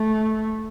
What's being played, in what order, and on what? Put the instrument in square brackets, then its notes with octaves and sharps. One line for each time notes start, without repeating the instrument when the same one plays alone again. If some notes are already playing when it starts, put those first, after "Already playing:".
Already playing: [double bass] A3